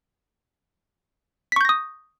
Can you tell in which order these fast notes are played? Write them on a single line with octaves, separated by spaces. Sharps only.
B6 C#6 G6 A#6 D#6